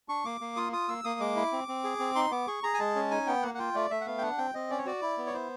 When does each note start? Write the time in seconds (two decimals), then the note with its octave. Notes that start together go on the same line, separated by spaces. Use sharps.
0.09 D4 C#6
0.25 A#3 D6
0.41 A#3
0.56 F4 D#6
0.72 F4 D#6
0.88 A#3 E6
1.04 A#3 D#6
1.20 G#3 D6
1.36 E4
1.52 C4
1.68 C4
1.84 G#4
1.99 C4
2.15 D#4 C6
2.31 B3 D6
2.47 G#4 C#6
2.63 G#4 A#5
2.74 G#5
2.79 G#3 A5
2.95 C#4
3.11 D#4 G#5
3.27 B3 G5
3.43 A#3 F#5
3.54 F#5
3.59 F4 G5
3.75 A3 D5
3.91 A3 E5
4.01 F#5
4.06 B3 F5
4.18 G5
4.22 D4 F#5
4.38 C4 G5
4.54 C4 D#5
4.70 C#4 D5
4.78 C#5
4.86 F#4 D5
5.02 E4
5.18 B3
5.27 C#5
5.34 E4 C5